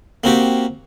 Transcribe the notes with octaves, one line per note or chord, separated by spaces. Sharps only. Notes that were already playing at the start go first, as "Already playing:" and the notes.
A#3 C4 F#4 G4